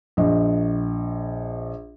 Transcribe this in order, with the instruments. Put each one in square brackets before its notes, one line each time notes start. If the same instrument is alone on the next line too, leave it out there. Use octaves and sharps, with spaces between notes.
[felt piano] A#1 D#5